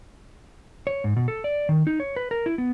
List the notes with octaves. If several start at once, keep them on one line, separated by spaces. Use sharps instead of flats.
C#5
G#2
B2
A4
D5
D#3
D#4
C#5
B4
A#4
E4
B3